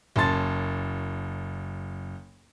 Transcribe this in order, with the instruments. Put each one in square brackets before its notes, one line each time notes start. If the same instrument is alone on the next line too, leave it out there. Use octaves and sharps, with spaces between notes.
[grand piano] F#1 C#4 A5 C6 A6